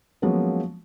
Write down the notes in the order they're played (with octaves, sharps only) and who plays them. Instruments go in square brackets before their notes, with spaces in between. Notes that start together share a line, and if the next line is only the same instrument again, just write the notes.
[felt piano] F3 F#3 G#3 A#3 B3 C#4